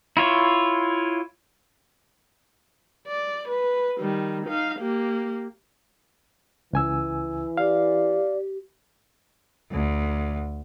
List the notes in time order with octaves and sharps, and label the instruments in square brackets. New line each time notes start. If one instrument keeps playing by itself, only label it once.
[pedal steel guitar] E4 F4 C#5
[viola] D5
B4
D#3 G3
D#4 F5
A#3 G4
[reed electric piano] C#2 G#5 E6 [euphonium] E3
[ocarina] G4 [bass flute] D5 [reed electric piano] F5
[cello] D2